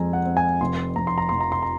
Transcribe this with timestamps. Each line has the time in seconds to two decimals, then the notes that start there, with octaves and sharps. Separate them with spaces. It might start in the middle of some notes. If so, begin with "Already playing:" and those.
Already playing: F2 G#3 C4 G#5 A#5
0.13 F#5
0.25 C4
0.37 G#5
0.61 F1 C6
0.96 F1 A#5
1.07 C6
1.18 A#5
1.29 F1 C6
1.40 A#5
1.52 C6
1.62 A#5